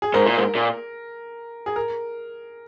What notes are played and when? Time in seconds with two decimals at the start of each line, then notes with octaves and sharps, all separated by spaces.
0.02 G#4
0.14 G#2 A#4
0.26 A#2
0.37 G#2
0.55 A#2
1.66 G#4
1.76 A#4